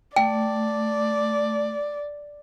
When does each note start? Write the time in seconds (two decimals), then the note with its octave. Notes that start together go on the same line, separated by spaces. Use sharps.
0.16 A3 D5 G5